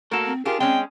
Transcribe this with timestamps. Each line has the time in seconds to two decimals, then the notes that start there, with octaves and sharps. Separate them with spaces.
0.11 A3 A#3 F#4 A4 A#4
0.26 C4
0.45 D4 F4 G4 G#4 A#4
0.60 G#3 C4 C#4 G5